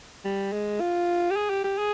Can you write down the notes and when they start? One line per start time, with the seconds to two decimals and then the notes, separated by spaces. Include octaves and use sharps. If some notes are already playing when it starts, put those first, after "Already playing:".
0.25 G3
0.52 G#3
0.80 F4
1.30 G4
1.36 G#4
1.50 G4
1.64 G4
1.78 G#4